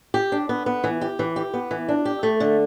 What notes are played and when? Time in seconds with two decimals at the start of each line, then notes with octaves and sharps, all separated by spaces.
0.14 G4
0.32 D4
0.49 B3
0.66 B3
0.84 E3
1.01 G4
1.19 E3
1.36 G4
1.54 B3
1.71 E3
1.88 D4
2.05 G4
2.23 A3
2.40 D3